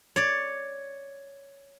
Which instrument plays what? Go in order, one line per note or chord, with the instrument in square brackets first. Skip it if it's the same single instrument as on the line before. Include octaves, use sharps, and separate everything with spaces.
[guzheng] C#5 D5